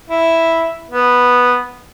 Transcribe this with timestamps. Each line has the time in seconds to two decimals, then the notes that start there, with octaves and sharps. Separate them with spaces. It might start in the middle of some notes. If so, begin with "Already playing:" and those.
0.10 E4
0.90 B3